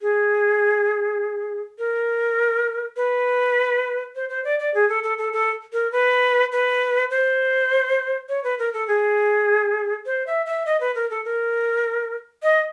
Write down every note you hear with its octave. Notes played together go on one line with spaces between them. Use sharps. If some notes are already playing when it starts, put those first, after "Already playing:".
G#4
A#4
B4
C5
C5
D5
D5
G#4
A4
A4
A4
A4
A#4
B4
B4
C5
C#5
B4
A#4
A4
G#4
C5
E5
E5
D#5
B4
A#4
A4
A#4
D#5